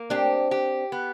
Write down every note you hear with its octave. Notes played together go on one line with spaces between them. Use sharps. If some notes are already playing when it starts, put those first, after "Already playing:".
Already playing: A#3
C4 D4 G4
G4
B3